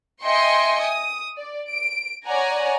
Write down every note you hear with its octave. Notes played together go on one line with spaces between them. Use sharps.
D#5 E5 G5 G#5 C6 C#7
D#6
D5
D7
C#5 D5 F#5 G#5 A#5